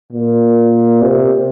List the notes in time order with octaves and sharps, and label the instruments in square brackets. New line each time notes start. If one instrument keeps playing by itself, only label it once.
[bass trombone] A#2
C3